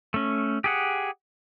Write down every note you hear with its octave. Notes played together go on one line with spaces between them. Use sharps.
A3 C#4
G4 G#4 F#5